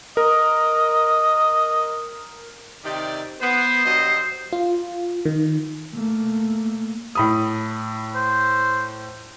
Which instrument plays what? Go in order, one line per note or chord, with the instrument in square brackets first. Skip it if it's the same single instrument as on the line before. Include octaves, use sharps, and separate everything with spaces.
[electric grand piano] A#4 [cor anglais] D#5
[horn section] C3 D#3 D5
[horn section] B3 [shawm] C5
[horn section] G2 F#3 D#5
[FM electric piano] F4
D#3
[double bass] A3 A#3
[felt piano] A2 B5 D#6
[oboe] C5